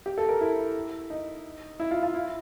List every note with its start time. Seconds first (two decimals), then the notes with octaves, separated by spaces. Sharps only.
0.06 G4
0.18 A4
0.29 A#4
0.41 E4
1.10 D#4
1.80 E4
1.91 F4
2.03 F4
2.14 E4